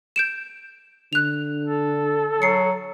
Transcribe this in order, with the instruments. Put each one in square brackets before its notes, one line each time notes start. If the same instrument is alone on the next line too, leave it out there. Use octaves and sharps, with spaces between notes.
[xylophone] G6 D7 E7
[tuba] D3 [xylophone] F#6 F7
[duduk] A4
[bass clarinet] F#3 [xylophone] C7 C#7